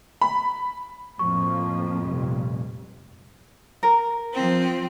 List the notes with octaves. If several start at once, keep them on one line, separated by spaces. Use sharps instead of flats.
B5
F2 A2 F3 A#3 C#6
F1 G2 A#2
A#4
F3 C4